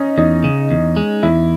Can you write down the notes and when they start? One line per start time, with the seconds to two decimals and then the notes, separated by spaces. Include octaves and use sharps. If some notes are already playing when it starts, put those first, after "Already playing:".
Already playing: C#4 D#4
0.18 E2 D#4
0.44 C#3
0.71 E2
0.96 G#3
1.23 E2 E4